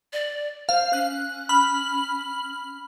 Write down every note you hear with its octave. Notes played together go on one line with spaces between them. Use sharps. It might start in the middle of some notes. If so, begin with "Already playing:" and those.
D5
C5 F5
C#4 F#6
B5 F6 F#7